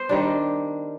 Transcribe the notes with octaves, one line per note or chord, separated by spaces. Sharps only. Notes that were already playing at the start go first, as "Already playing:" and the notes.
Already playing: B3 C5
D#3 G3 D4